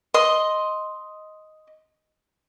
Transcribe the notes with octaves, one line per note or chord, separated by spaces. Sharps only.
D#5 C6